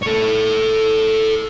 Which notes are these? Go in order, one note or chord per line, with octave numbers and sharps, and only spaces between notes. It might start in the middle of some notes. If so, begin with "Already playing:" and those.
A4 C#5